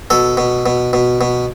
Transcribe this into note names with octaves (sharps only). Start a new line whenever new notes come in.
B2 A4
B2
B2
B2
B2